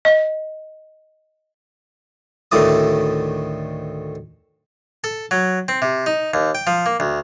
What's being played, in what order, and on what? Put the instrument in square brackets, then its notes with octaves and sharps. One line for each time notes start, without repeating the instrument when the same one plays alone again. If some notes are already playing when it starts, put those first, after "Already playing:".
[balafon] D#5
[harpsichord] D2 A2 D#3 E4 D5 D#6
A4
F#3
C4
C3
D#4
D#2
G5
F3
A#3
D2